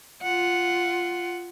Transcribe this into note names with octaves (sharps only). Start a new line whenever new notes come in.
F4 F#5